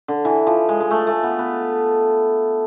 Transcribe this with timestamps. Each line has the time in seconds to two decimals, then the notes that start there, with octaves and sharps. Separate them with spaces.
0.08 D3
0.25 E3
0.47 F3
0.69 G#3
0.80 G#3
0.91 A3
1.07 A3
1.23 B3
1.39 B3